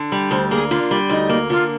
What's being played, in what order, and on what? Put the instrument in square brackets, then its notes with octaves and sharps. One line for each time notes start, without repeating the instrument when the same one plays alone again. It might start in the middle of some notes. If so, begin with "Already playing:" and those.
Already playing: [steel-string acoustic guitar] D3
G3
[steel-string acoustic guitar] D2 [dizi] C5
[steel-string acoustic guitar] A#3 [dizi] G#4
[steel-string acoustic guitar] D3 [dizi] F4
[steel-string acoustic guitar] G3
[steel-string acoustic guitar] D2 [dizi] D#4
[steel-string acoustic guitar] A#3
[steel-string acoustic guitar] D3 [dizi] F4